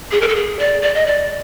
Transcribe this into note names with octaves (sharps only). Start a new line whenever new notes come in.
G#4
A#4
A4
G#4
D5
D5
D#5
D5